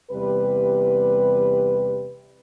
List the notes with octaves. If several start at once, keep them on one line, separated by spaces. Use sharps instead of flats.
E2 C3 G3 B4